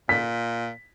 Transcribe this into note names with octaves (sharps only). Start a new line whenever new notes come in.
A#2 B6